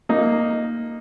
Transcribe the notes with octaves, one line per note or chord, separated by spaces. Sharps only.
A#3 D#4